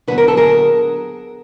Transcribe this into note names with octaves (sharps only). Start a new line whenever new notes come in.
D3 F#3 B3 B4
A#4
A4
G#4 A#4